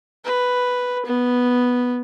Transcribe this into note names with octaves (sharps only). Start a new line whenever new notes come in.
B4
B3